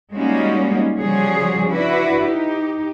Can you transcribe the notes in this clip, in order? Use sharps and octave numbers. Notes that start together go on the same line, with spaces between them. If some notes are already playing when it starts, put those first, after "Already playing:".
G3 G#3 A#3 C#4 D#4 F#4
C#3 F3 G3 F#4 G#4 C#5
D4 E4 F#4 B4
D#4 G4